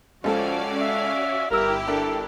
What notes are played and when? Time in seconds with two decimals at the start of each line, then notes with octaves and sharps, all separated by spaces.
0.24 C#2 F3 C#4 F#4 A4 D5 F5
0.80 E5
1.51 G1 G3 E4 G4 A#4 E6
1.87 D4 A4 A#4